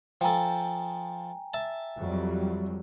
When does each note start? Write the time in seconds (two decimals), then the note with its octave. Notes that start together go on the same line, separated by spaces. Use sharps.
0.21 F3 A4 G5 G#5 A#5
1.54 E5 A5
1.98 F2 F#3 G3